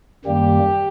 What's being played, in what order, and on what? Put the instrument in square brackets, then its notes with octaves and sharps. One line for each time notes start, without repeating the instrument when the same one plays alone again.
[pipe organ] F#2 D#3 G3 A#3 [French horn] G4